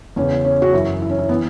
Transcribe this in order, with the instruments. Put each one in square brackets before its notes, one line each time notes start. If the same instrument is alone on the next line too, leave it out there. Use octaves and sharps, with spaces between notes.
[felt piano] E2 C#3 E3 C#4
C#4
F#4
F#2 E3 E4
E4
C#4
E4
B3
E3